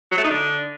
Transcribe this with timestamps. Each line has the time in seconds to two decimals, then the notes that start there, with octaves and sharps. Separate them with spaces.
0.12 F#3
0.18 A3
0.24 D#4
0.30 D3